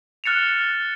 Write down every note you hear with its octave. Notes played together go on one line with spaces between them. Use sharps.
F6 F#6 A6 C#7 E7 F7